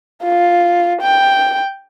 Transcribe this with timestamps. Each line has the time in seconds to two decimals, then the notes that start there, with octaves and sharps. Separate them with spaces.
0.23 F4
1.01 G5